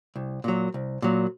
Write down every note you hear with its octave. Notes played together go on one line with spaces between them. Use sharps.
C2
A#2 F#3
C2
A#2 F#3